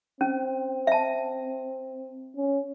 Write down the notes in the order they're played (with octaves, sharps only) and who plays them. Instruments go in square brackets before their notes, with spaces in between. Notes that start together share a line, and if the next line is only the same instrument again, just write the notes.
[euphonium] C4 [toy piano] C#4
[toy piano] E5 A5
[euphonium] C#4